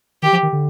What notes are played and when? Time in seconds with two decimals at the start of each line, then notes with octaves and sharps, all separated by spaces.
0.22 D#3 G4
0.33 F3
0.43 D#3
0.53 D3